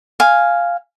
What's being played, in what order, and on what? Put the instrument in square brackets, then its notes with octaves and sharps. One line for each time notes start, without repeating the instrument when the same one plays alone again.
[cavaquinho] F5 G#5